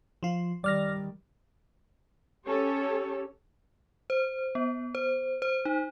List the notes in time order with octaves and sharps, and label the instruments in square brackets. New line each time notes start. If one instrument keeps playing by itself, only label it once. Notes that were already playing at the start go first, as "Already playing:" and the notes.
[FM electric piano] F3 F4
[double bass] D#3 G3 [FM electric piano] D5 F6 A#6
[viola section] C#4 G4 A4 C#5
[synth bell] C5
B3
C5
C5
D#4